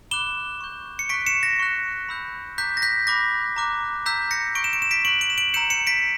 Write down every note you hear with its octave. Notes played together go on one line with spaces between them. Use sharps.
B5 D6 F#6 E7 G7
C#6 G6
C#7
C#6 F#6 B6 D7
C#7 E7
A#6
C#6 F#6
B5 E6 G6
A#5 D6 F#6 G6 B6
A#6
G6 B6
B5 D6 F#6 A#6
A#5 D6 F#6
A#5 E6 G6 B6
A#6 C#7
C#6 G6 D7
E7
D7
E7
B6 D7
C#6 F#6 D7 F#7
D7 F#7
E7
D7 F#7
A#5 E6 G6 C#7 E7
C#7 E7
B6 D7